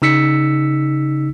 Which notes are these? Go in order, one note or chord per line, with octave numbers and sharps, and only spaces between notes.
C#3 D#4 E6 B6 C#7